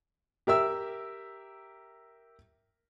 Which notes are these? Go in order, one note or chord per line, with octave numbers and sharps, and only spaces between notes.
G4 A#4 E5 E6